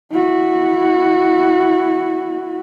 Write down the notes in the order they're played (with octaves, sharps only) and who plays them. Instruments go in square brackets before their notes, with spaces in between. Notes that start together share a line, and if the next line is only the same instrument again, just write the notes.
[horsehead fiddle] E4 F#4